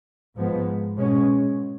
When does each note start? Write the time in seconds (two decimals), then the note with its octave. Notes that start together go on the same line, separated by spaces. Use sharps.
0.36 G#2 F3 G#3 B3
0.96 B2 G#3 C#4